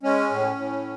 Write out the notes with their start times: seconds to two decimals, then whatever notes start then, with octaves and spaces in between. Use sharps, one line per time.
0.03 G#3 C#4
0.30 A2
0.56 A2